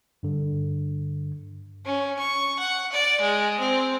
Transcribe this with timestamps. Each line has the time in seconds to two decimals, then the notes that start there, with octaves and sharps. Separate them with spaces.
0.23 G2 D3
1.85 C#4
2.19 C#6
2.59 F#5
2.92 D5
3.21 G#3
3.60 C4